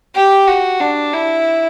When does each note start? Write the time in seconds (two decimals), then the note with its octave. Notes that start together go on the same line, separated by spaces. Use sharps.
0.15 G4
0.47 F#4
0.80 D4
1.13 E4